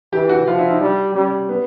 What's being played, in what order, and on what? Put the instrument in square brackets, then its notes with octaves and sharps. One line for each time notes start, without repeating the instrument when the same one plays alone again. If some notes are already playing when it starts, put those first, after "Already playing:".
[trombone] E3 [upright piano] G4
[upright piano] F#4
[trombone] F3 [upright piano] F4
[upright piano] E4
D#4
[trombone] G3 [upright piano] D4
[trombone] G3 [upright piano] C#4
[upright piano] B3